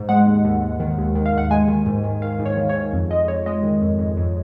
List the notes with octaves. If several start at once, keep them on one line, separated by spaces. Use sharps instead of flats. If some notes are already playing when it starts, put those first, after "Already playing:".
Already playing: G#2
G#3 F#5
D#2
D#2
D#2
D#3
D#2
D#3
F5
D#2 F#5
G#3 G#5
D#3
G#2
D#3
D#3 F5
G#2
C#5
D#3
C#5
G#2
F2
G#3 D#5
F2 C#5
G#3 D#5
D#3
F2
F2
F2